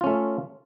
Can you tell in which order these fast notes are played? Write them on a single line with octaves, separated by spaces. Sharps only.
F4 C#4 A3